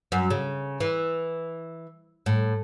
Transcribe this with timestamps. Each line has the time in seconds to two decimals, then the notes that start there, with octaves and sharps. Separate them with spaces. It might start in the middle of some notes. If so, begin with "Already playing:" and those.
0.12 F#2
0.30 C#3
0.80 E3
2.26 A2